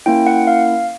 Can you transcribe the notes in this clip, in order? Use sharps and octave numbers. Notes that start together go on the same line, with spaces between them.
A#3 C#4 E4 G5
F#5
F5